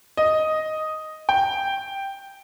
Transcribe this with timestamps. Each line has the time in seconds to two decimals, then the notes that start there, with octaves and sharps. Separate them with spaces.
0.17 D#5
1.29 G5